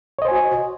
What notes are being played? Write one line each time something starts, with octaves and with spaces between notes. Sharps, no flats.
F#4 C5 C#5 D#5 G#5